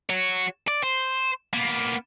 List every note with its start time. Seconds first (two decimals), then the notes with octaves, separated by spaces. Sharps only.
0.10 F#4 C#5
0.68 D5
0.83 C5
1.53 A#3 B3